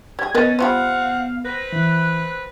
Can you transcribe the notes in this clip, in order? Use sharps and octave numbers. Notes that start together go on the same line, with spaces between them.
G3 G#4 G#6
F#3 B3 C#4 A#4 B4 D#5 A6
G3 C4 F4 C5 F5 F#5
C4 B4 A#6
E3 F#6